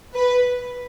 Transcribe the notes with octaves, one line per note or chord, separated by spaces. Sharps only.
B4